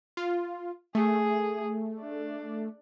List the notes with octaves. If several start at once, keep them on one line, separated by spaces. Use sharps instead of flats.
F4
A3 G#4
D4